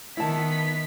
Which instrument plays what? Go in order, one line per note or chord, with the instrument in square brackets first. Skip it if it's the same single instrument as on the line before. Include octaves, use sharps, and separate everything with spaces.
[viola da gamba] D#3 [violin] B3 B6 [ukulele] E4 A5